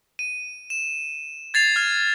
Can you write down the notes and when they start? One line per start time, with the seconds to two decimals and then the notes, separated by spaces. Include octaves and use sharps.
0.19 D#7
0.70 E7
1.54 G#6 A6 C7 F7
1.76 F6 G#6